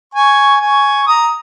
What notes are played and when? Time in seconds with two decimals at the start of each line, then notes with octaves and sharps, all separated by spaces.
0.14 G#5 C#6
0.60 G#5 C#6
1.07 A#5 D#6